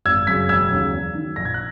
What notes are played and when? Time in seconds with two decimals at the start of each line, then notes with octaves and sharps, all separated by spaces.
0.06 G#1 E6 G#6
0.27 F#2 C#3 G#6 B6
0.49 E1 E6 G#6
0.70 D#2 C#3 F#3
0.92 E2
1.15 D#3 F#3
1.36 A#1 A#6
1.45 G#6
1.54 F#6